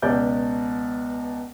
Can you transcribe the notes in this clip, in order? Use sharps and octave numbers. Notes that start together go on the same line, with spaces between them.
C#2 B2 D5 G6